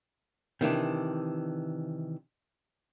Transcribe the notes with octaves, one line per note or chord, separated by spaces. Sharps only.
C3 D#3 E3 D4